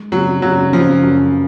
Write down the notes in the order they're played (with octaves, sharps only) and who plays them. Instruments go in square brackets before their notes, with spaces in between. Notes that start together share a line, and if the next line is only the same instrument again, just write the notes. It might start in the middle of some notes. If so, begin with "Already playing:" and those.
Already playing: [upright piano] G#3
[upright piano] C#3 [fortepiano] F#3
[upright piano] C#3 [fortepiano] F#3
[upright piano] C#3 [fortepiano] F3
[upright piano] F#2